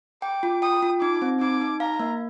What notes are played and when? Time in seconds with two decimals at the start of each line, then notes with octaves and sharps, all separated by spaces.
0.22 G5 D6
0.43 F4
0.62 G5 D#6
0.83 F4
1.02 D#4 D6
1.22 C4
1.40 D#4 D6
1.61 D#4
1.80 F5 A#5
2.00 A#3